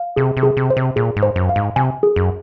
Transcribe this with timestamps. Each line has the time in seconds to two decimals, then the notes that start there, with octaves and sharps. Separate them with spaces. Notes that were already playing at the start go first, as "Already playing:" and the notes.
Already playing: F5
0.16 C3 G#4
0.37 C3
0.43 G#4
0.57 C3
0.70 C5
0.77 C3
0.96 A#2 G#4
1.16 G#2
1.23 C5
1.36 F#2
1.49 F5
1.56 G#2
1.76 C3 G#5
2.03 G#4
2.16 F#2